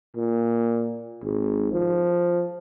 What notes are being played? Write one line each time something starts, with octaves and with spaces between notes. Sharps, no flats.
A#2
G#1
F3